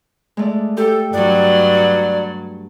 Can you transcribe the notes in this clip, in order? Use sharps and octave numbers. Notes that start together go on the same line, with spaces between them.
G#3 A3 D5
G4 A4 G5
G2 F#3 D5